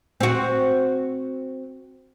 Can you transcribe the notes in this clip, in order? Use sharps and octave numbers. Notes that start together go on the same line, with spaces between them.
C4 F#4